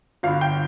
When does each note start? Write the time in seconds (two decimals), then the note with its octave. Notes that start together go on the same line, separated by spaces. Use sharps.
0.23 G1 G2 D3 F5
0.41 G5